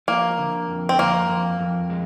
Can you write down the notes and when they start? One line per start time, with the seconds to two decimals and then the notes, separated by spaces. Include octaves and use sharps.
0.08 F3 A#3
0.38 D3
0.68 F2
0.89 C4
0.99 F2 A#3
1.29 F2
1.60 F2
1.90 G#3